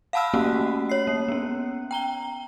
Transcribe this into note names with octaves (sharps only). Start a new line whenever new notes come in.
F5 F#5 A5 B5 E6 F6
A3 A#3 C#4 F#4 G4
C#5 C7
A#3
B3 C#4
G5 A#5 G7